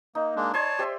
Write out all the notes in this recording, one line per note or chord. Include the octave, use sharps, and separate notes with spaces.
A#3 D#4
G#3 A#3 D4
C#5 D5 G#5 A5 C6
G4 C5 E5